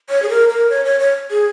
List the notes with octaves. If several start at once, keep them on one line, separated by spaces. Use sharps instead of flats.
C#5
G#4
A#4
A#4
C#5
C#5
C#5
G#4